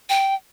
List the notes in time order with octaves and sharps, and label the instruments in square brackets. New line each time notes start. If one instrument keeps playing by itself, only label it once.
[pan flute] G5